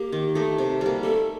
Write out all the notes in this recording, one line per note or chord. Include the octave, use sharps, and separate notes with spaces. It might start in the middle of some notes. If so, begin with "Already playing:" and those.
Already playing: A#3 G4
D#3
A3 D#4
C3
G3 A#3
A3 A4